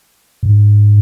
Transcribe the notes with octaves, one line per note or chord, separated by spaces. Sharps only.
G#2